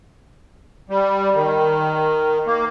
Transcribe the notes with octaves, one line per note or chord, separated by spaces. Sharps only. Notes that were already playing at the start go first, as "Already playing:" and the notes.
G3
D#3
A#3